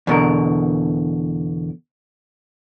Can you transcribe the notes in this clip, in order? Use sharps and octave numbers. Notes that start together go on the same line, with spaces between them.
E2 B2 D3 A#4